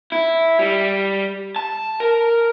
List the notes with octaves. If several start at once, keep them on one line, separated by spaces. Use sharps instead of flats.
E4
G3
A5
A#4